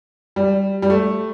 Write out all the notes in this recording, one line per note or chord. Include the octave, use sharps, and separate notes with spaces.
G3
G3
A3